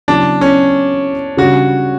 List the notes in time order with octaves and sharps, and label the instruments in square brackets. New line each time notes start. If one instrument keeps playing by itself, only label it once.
[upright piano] C#3 F#3 B3 E4 [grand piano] D4
[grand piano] C#4
[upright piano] C#3 G3 D4 [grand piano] F#4